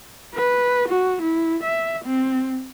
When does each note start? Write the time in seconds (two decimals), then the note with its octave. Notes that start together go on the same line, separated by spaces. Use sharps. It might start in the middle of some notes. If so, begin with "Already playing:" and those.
0.34 B4
0.88 F#4
1.22 E4
1.63 E5
2.05 C4